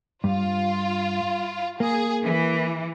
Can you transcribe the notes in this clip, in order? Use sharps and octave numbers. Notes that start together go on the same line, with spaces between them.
G2 F4
A#3 G#4
E3